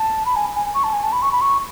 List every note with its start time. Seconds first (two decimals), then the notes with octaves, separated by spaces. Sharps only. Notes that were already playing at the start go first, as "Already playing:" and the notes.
Already playing: A5
0.26 B5
0.36 G#5
0.55 G#5
0.74 C#6
0.84 A5
0.93 G#5
1.04 A5
1.13 B5
1.22 C#6
1.32 B5
1.41 C#6